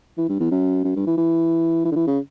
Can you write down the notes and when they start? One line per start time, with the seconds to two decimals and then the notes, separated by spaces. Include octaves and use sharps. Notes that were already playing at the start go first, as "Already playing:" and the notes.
0.18 E3
0.29 G2
0.40 E2
0.51 F#2
0.84 F#2
0.96 G2
1.07 E3
1.17 E3
1.85 E3
1.92 D3
1.96 E3
2.07 C#3